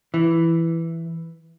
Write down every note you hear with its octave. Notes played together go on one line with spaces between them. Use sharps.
E3